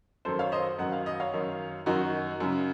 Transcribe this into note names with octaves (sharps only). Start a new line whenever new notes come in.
F#2 D#3 A4 C5
C#5 F5
C5 D#5
F#2 D#3 F#5
F5
D#5
C#5 F5
F#2 D#3
F#2 D#3 D#4 F#4
F#2 C#3